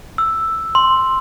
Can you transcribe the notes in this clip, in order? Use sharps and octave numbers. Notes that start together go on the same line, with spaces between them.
E6
C6